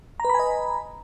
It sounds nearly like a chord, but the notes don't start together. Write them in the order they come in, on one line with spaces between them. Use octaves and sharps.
A#5 B4 B5 G#5 D#5